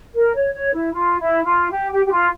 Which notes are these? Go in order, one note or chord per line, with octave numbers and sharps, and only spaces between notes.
A#4
C#5
C#5
E4
F4
E4
F4
G4
G4
G4
F4